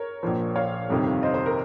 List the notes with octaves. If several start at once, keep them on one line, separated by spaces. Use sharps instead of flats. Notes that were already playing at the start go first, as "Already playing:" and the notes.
Already playing: A#4 C#5
A#1 A#2 F3
C#5 F5
G1 F2 C3 D#3
C5 D#5
C5
A#4